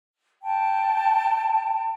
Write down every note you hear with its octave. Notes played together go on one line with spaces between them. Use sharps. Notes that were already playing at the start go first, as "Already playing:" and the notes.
G5 A5